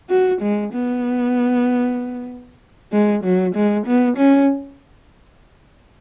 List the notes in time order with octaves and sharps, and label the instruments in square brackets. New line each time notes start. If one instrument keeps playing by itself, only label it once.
[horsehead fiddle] F#4
G#3
B3
G#3
F#3
G#3
B3
C#4